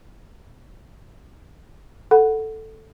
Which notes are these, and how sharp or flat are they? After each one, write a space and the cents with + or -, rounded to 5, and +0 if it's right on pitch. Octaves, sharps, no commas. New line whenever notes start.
A4 +0 F#5 +0 B5 +0